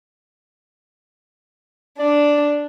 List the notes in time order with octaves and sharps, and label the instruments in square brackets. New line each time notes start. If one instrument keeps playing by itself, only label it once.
[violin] D4 [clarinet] D5